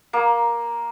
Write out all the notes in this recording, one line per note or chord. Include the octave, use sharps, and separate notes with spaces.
A#3